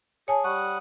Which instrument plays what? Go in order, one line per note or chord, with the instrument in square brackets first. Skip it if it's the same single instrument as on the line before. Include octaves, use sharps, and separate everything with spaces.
[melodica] G#4 [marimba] C#5 G#5 A5
[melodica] G3 F#5 D#6 [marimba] C#6